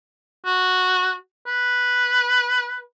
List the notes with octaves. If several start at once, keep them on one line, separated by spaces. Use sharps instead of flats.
F#4
B4